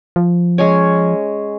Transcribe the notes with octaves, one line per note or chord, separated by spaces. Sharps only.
F3
G#3 C#4 C#5